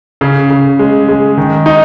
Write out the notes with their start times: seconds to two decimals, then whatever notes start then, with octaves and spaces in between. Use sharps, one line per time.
0.21 C#3
0.50 C#3
0.79 G#3
1.08 G#3
1.38 D#3
1.66 D#4